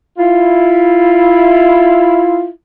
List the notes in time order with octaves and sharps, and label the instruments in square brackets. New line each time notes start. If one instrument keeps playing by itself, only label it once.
[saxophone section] E4 F4